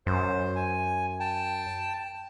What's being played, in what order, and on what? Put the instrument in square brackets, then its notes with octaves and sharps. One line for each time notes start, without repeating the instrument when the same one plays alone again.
[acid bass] F#2 [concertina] C5
[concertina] G#5
G5 A5